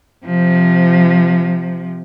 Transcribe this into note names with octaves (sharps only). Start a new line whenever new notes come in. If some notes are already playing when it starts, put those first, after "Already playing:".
C3 F3